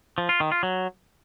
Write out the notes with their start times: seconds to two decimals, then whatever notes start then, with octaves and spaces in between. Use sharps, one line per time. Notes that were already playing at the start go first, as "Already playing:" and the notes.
0.18 F3
0.29 F4
0.40 D#3
0.52 F4
0.63 F#3